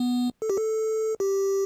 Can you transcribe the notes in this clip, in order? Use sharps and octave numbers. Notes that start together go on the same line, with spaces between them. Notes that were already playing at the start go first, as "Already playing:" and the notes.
Already playing: B3
A4
G4
A4
G4